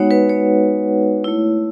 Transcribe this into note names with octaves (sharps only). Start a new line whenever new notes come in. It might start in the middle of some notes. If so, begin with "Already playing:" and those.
Already playing: G#3 B3 D#4 F#4 C#5 F#5
B4
C#5
A3 E4